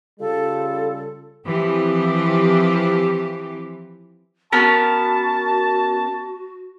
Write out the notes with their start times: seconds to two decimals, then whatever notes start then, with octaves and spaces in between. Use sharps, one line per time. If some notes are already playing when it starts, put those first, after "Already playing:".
0.20 C#3 G3 F4 A4
1.45 E3 F3 C4 G4
4.52 B3 C#4 F#4 A#4 A5